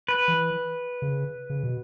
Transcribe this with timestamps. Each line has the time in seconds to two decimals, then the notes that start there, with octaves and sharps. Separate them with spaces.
0.08 B4
0.28 E3
1.02 C#3
1.50 C#3
1.64 B2